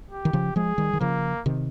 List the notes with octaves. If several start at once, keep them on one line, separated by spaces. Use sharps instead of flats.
G4
D#3
C#3 F3
F3 G#3 G#4
D#3 G3
D#3
C#3 F3 A#3
C3 D#3